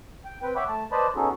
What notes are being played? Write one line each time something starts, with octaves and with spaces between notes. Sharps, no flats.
G5
C4 B4 G5
C#5 E5 F#5 G5 B5 D6
A3 A5
B4 C5 D5 D#5 A5 B5
B3 C#4 D#4 F#4 G#4 A4